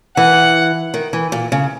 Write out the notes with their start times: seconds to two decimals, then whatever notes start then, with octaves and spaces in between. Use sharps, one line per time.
0.17 E3 F#5
0.94 D#3
1.13 E3
1.32 A#2
1.52 C#3